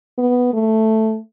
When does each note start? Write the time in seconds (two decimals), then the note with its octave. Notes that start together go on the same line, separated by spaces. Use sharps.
0.18 B3
0.53 A3